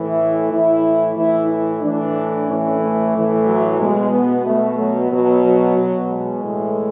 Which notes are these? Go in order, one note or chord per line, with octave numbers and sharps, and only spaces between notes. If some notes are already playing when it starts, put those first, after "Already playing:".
Already playing: A2 E3 E4
A2 E3 E4
A2 E3 E4
E4
A2 E3 D4
A2 E3 C#4
A3
A2 E3
F#3
B2 G#3
B3
B2 A3
F#3
B2 F#3
F#3
B2
G#3
A2 E3